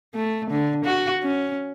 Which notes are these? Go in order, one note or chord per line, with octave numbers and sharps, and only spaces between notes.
A3
D3
F#4
C#4